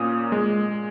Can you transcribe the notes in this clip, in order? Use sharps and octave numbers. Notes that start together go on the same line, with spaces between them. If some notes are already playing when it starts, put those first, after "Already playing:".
Already playing: A#2 A#3 C#4 D#6
G#3